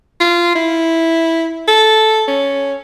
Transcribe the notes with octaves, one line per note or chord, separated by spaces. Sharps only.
F4
E4
A4
C#4